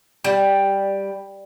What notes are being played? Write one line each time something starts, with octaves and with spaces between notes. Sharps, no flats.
G3